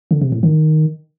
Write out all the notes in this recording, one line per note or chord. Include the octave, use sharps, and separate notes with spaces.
D3
C3
A2
D#3